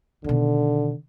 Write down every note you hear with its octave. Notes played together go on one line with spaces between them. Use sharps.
B2 D3 D#3